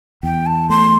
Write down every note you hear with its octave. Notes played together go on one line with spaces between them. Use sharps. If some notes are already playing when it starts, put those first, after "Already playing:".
E2 G5
A5
A3 C6